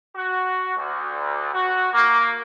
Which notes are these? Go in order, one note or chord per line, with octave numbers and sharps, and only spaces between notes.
F#4
D2
F#4
A#3